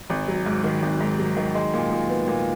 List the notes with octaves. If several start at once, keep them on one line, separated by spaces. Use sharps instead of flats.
G#1
F#3
G#2
D#3
G#1
G#2
F#3
D#3
G#3
A#2
A#2
B3
A#2